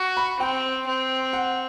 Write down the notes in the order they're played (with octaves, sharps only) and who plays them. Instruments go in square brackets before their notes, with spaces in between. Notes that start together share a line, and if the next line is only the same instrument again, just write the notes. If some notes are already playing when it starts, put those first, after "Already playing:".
Already playing: [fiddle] F#4
[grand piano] B5
[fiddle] C4 [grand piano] G5
[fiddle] C4
[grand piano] F#5